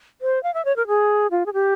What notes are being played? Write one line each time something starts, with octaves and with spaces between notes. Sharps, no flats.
C5
F5
E5
C#5
A#4
G#4
F4
G#4
G4